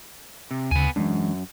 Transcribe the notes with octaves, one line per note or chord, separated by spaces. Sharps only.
C3
D2 C#3 B3 G#5
F#2 E3 G#3 D4